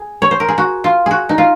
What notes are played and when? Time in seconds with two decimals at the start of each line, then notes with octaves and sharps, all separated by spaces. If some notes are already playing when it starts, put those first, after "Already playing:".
Already playing: G#4
0.22 C#5
0.31 C5
0.40 A#4
0.48 G#4
0.58 F#4
0.84 F4
1.06 F#4 G#4
1.29 D#4
1.38 F4